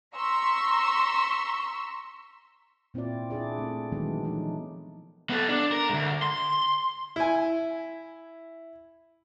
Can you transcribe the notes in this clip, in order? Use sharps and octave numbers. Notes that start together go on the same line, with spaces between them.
A#5 C6 C#6 E6 B6
A#2 C4 E4 F4 D5
D4 E4 G#4 D5
A3 C4
D#3 E3 F#3 G#3 B3 D4
E3 F3 D4 D#4
B3 A4
D4
A#4
D2 G#2
C6
E4 G#5